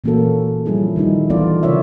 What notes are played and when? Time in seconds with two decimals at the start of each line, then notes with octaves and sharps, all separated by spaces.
0.04 A#2 E3 A#3 C#4 F#4 A4
0.66 F3 G3 C#4 E4 G#4
0.96 D#3 G3 D#4 E4
1.30 E3 F3 B3 F4 A4 D5
1.63 C#3 E4 A#4 C#5 D5 E5